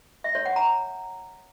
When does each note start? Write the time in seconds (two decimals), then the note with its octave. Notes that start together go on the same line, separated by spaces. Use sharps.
0.24 E5
0.35 C#5
0.46 F#5
0.56 A#5